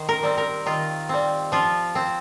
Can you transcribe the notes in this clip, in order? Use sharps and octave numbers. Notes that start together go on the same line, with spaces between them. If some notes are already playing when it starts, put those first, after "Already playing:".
Already playing: D#3 C5
A#4
G3 C4
A#4
D#3 F4
G3 C4
F3 F4
C4